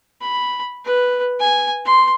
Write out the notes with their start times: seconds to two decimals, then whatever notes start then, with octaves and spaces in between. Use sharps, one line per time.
0.21 B5
0.85 B4
1.40 G#5
1.85 C6